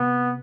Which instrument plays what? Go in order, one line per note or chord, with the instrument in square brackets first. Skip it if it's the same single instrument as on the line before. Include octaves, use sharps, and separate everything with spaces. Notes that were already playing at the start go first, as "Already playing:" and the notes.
Already playing: [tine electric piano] C3 [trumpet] B3